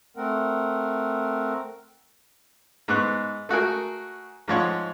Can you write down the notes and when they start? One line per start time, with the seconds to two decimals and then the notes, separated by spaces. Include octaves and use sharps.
0.17 A3 C4 A#4 F#5
2.88 G#2 B3 C#6 F#6
3.49 A3 F#4 G#4 A#4
4.48 G#2 F3 C#5 F#5